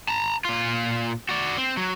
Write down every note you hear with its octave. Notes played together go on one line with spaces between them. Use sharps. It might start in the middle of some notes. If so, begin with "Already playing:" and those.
A5 A#5
A#2 F4
F#4 D5
C4
F#3